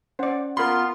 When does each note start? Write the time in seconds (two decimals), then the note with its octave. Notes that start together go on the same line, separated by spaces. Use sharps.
0.19 C#4 C5 D5 F#5
0.57 B3 F4 A#4 B5 C6